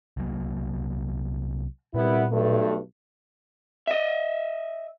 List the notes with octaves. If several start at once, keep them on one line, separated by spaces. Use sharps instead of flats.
C2 F#3 A#3
C2 A#2 B3 E4
B1 G2 A3
D#5 E5